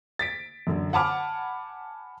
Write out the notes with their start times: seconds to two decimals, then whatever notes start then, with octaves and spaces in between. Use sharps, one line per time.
0.19 A6 B6 D7
0.67 F#2 D3
0.93 F#5 G#5 A5 B5 D6 F6